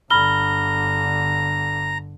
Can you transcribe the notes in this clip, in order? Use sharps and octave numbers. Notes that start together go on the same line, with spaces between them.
G1 D3 A#5 B5 F6 G7